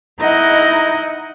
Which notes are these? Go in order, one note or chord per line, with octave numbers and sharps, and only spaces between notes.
D#4 E4 D#5 F#5